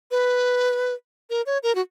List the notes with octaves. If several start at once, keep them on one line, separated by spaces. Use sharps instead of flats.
B4
A#4
C#5
A#4
F#4